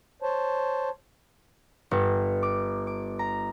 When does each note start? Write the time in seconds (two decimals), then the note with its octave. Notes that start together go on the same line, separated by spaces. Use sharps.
0.22 C5 C#5 A5
1.91 G1
2.43 D6
2.87 D6
3.19 A#5